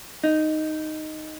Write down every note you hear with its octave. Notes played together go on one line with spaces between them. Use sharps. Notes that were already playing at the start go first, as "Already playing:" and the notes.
D#4